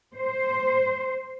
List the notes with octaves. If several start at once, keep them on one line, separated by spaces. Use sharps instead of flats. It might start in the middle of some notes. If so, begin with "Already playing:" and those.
C5